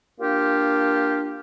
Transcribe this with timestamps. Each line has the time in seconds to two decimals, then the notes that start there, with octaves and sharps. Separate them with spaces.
0.21 A#3 D4 F4 G4